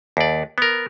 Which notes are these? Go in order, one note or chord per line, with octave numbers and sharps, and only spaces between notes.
D#2 D5
B3 A#4